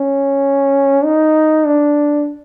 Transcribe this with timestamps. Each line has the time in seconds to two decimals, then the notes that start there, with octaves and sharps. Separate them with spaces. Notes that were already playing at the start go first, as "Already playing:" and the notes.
Already playing: C#4
1.05 D#4
1.66 D4